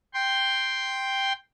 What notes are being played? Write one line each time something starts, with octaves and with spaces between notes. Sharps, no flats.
G5 C6